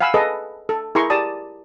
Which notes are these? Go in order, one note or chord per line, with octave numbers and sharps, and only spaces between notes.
F5 F#5 G#5 B5 E6
G#4 A4 B4 D#5
A4
E4 G#4 A#4 A#5 C6 C#6
G4 D5 A5 D#6